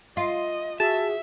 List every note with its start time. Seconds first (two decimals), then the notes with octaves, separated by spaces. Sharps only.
0.17 F4 D#5
0.80 F#4 G#4 E5 A5